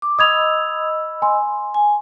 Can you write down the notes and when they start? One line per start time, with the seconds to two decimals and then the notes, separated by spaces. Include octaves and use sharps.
0.02 D6
0.19 D#5 B5 D#6 E6 G#6 F7
1.22 G#5 C6
1.74 G#5